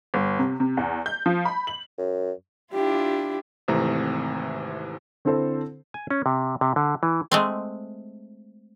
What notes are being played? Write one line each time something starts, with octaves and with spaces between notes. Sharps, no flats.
G1
C3
C3
E2
G6
F3
B5
F#7
F#2
D4 E4 F4 G4
G#1 C3 E3 A3 C4 A#5
D3 C4 E4 A4 C5
G#5
C#4
C3
C3
D3
E3
G#3 A3 C4